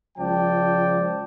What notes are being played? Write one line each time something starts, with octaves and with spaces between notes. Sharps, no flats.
C#2 F3 D5 G5 A5